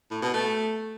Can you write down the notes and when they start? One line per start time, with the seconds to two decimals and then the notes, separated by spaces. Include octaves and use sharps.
0.11 A2
0.22 B2
0.34 A3